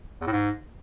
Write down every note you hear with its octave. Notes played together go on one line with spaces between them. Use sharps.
E2
A2
G#2